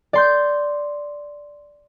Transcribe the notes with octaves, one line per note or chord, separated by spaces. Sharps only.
D5 C6 G6